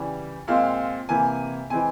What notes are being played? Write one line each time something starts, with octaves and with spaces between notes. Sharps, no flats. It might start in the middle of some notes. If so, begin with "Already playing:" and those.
Already playing: C#3 E3 G3
A#2 G#3 C4 F5
C3 E3 A#3 G#5
E3 G#3 C4 G#5